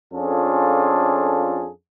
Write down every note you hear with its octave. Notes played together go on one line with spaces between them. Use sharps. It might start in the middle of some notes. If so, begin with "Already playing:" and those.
F2 C#4 D4 F4 G#4 A4